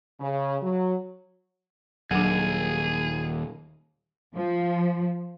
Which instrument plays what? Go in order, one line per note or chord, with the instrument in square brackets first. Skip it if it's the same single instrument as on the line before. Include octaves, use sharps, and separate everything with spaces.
[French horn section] C#3
F#3
[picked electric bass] D#1 [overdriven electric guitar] D#2 [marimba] F#3 D4 [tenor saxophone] G#4
[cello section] F3